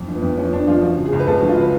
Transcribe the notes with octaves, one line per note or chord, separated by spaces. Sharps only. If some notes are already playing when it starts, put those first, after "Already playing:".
Already playing: F2
F3
B3
F2
F3 C#4
F2 D4
F3 F4
F3 F#4
C#3
G#4
C#2
B4
C#2 A4
F#4
F3
F4
C#3 B4